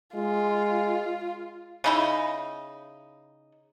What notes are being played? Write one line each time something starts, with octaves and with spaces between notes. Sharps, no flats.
G#3 F4
C#3 D#4 E4